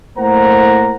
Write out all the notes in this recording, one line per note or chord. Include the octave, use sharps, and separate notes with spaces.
A2 A#3 C5 F#5 A#5